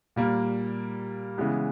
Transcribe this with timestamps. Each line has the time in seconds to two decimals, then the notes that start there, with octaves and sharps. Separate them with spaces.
0.16 A#2 G3 A#3
1.38 C#3 E3 G#3 B3